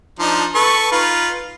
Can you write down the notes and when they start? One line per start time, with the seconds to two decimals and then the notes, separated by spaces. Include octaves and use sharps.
0.19 F3 D4 D#4
0.55 A4 B4 C#6
0.92 D#4 F4 B4